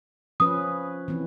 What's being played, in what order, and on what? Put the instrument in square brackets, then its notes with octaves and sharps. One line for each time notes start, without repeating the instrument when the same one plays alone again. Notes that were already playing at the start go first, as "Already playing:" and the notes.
[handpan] F3 C#4 B4 [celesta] D#6
[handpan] E3 C4